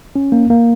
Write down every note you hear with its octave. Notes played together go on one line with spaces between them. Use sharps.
C#4
A#3
A#3